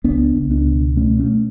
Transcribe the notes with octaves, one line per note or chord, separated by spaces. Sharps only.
C#2 B3 D4
C#2
B3 D4
B2
B2 A3 C#4
A3 C#4